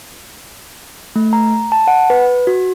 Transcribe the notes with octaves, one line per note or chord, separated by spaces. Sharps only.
A3
A#5
A5
F#5
B4
F#4